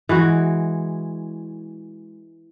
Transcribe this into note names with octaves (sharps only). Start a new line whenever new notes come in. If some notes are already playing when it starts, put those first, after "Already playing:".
E3 G#3 F#4